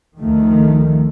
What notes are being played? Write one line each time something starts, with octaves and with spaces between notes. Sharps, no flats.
D2 D#3 F3 A3